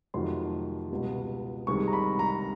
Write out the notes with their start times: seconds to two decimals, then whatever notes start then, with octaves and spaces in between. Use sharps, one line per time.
0.14 F2 C3 D#3 F#3 A3 C6
0.91 C#2 B2 G3
1.67 C2 C3 D#3 G#3 C#6
1.88 A#5
1.93 B5
2.19 A#5